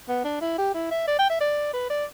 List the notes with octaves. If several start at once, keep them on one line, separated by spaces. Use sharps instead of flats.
B3
D4
E4
G4
E4
E5
D5
G5
E5
D5
B4
D5